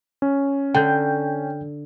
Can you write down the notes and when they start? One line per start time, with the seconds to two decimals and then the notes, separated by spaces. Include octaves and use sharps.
0.22 C#4
0.75 D3 G5 G6